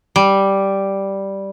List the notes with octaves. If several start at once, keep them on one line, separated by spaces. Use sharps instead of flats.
G3